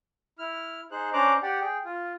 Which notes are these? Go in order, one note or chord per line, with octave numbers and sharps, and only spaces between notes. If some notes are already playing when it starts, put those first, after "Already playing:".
E4 F6
D#4 G#4 C5 F#6
C#4 D4 C5 A#5 D6 F#6
G4 D5 F#5 G5
G#4 G5
F4